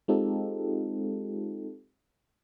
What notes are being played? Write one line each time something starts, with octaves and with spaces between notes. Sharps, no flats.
G#3 C4 D#4 F4 G4 A4